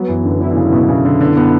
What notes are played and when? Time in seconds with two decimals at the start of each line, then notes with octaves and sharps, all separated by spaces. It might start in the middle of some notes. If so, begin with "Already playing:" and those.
Already playing: F#3 B3
0.08 F#2 E3
0.24 F#2 D3
0.40 D3 E4
0.51 D3
0.56 F#2 C#3
0.73 B2 E4
0.89 C#3 E4
1.05 F#2 D3
1.21 F#2 D3
1.37 B3